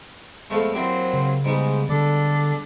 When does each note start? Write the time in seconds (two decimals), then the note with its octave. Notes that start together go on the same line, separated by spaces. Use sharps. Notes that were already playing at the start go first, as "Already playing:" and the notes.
0.50 F2 F3 G#3 A3 B3 A4
0.74 F#3 A#3 C4 E4 G4 D5
1.14 C#3
1.44 G#2 G3 G#3 B3
1.89 D3 D4 A4 D5